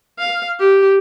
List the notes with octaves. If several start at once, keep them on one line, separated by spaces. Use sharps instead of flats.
F5
G4